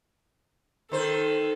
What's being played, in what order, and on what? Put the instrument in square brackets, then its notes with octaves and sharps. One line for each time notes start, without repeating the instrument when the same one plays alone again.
[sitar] D#3 C5 [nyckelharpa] A4